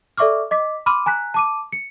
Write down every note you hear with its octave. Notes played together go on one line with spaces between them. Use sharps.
A4 D5 E5 C#6 D6 F6
D#5 D6 B6
B5 C6 D6 F6 D#7
G#5 A#5 F#6 B6
A5 D6 D#7
C#7